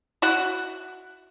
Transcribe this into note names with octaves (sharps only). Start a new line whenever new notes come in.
E4 F#4 F#5